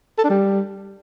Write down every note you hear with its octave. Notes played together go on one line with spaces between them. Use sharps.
A4
D4
G3